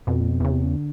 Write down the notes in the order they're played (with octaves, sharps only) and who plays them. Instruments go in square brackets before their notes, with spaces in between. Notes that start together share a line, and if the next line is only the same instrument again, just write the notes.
[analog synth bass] F2 [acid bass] B2
[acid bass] A#2
B2
[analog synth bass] E2 [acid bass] C#3
[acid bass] C3
C#3
D3